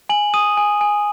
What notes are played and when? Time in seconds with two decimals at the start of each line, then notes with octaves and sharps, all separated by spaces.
0.09 G#5 F#7
0.34 D#6 D#7
0.57 G#5
0.81 G#5